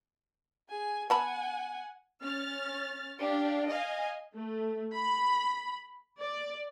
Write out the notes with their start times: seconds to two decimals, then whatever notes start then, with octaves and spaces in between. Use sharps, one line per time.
0.69 G#4 G#5
1.10 B3 F#5 G#5 A5 B5
2.23 C#4 F6 A6
3.20 D4 G4 F5
3.69 D#5 F5 G#5
4.34 A3
4.94 B5
6.19 D5